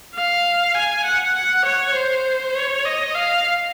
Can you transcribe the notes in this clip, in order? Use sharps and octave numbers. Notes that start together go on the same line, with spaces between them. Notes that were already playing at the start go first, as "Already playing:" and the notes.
F5
G#5
F#5
F#5
C#5
C5
C#5
D#5
F5